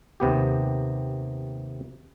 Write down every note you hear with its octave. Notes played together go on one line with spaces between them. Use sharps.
D#2 C3 B3 G4